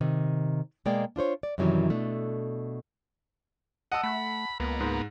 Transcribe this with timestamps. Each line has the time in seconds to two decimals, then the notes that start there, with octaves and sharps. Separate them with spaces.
0.01 C3 D#3
0.85 B2 G#3 A#3 D5 G5
1.16 D4 F4 C5 C#5
1.43 D5
1.58 F#2 C3 D#3 E3 F#3 G3
1.90 B2 A3 D4
3.92 D#5 F#5 A5 E6
4.04 A3 B5
4.60 C#2 A#3 B3
4.80 G#2